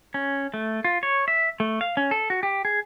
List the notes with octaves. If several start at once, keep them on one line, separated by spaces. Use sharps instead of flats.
C#4
A3
F4
C#5
E5
A3
F5
C#4
A4
F#4
G4
G#4